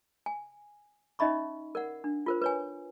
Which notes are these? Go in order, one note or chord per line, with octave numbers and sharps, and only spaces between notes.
G#5
C#4 D#4 D#5 E5 B5 C#6
A#4 D5 F#5
D4
F4 A#4 C5
B4 C#5 G#5